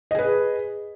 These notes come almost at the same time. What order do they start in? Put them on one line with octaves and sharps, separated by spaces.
D#5 G#4 B4